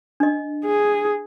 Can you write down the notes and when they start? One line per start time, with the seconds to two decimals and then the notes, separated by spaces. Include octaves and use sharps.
0.20 D4 D#5
0.65 G#4